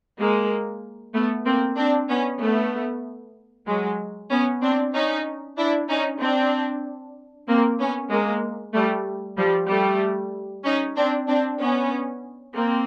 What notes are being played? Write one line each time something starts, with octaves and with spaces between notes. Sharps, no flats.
G#3 A#3
A3 B3
A#3 C4
C4 D4
B3 C#4
A3 B3
F#3 G#3
B3 C#4
C4 D4
C#4 D#4
D4 E4
C#4 D#4
C4 D4
A#3 C4
B3 C#4
G#3 A#3
G3 A3
F3 G3
G3 A3
C#4 D#4
C4 D4
C4 D4
B3 C#4
A#3 C4